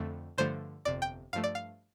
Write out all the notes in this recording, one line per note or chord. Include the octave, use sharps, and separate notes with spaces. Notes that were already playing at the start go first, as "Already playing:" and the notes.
Already playing: F2 D3 A3
G2 D3 F3 A3 C5
G1 F2 C3 D5
G5
G2 F3 A3 F5
D5
F5